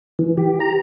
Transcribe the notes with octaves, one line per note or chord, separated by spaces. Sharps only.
E3
G4
A#5